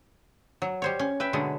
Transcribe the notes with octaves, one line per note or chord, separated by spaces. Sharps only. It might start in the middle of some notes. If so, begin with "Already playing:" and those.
F#3
G3 C5 C#5
C#4
B4 E5 G5
B2 D3 F#3 G#3 A3